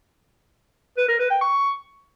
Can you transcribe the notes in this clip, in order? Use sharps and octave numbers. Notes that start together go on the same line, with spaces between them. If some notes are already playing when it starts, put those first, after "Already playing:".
B4
A#4
B4
G5
C#6